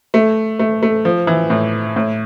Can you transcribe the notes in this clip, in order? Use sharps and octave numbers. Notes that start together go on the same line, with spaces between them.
A3
A3
A3
F3
E3
A2
A2